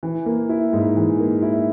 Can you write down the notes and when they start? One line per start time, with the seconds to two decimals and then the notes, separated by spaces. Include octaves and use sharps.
0.03 E3
0.26 A#3
0.49 E4
0.73 G#2
0.96 E3
1.19 A#3
1.42 E4